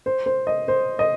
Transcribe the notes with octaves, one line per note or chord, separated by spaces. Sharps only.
C5
C5
D#5
C5
D#5